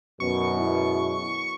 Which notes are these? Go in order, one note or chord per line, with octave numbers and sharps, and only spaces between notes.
F#2 B2 D#3 F#3 B3 C#6
G#3 B3 E4